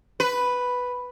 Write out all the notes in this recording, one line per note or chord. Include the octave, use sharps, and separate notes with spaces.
B4